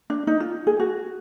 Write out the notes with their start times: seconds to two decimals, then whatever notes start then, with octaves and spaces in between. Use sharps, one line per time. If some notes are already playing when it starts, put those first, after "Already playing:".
0.10 D4
0.27 D#4
0.40 F4
0.67 G#4
0.80 F#4